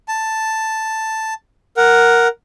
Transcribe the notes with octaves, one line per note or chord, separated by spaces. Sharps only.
A5
A#4 F#5